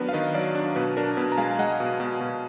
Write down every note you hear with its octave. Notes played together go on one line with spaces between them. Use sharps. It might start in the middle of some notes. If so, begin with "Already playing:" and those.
Already playing: D#3 F#3 B3 D4 A#4 B4
F5
D#3 B4 D#5
F#3 D5 F5
D4
B2 B4
D4 A#4
B2 B4
A#5
G#3 F5 G#5
G#5
G#3 D#5 F#5
B2
B2
B2